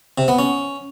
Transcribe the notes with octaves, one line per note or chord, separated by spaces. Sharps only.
C3
B3
C#4